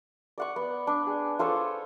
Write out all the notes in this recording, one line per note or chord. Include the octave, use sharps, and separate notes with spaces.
D5 F#5 C#6
B3
D4
G#4
F4 A4 C5 C#5